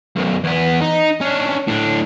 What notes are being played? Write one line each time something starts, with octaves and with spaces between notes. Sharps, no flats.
B1 F#2
E2 B3
D#4
C#4 D4
A2 D4